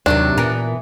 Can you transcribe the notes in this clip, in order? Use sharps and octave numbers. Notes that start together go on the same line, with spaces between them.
D#2 C3 D#3 F#3 D4
A#2 E3 B3 A#4